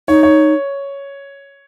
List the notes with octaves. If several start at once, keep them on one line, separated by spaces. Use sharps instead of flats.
D#4 C#5
C#5